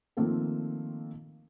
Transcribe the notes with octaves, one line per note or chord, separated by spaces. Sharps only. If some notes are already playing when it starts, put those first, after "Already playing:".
D#3 F3 A3 A#3 C4 A4